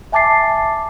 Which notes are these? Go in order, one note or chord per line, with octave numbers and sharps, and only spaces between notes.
E5 G#5 A5 D6 A6 C7